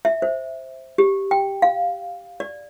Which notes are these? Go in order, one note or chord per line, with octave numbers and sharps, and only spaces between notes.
E5
C5
G4
G5
F5
D5